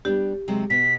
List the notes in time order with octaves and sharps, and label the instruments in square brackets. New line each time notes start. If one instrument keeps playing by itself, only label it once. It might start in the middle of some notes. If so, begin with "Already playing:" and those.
[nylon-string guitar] G3 B3 D4 [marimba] G4
[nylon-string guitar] C3 F#3 G#3
[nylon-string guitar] B2 B3 [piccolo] B6